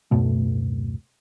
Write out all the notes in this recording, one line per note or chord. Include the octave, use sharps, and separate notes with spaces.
D1 F#2 B2 A3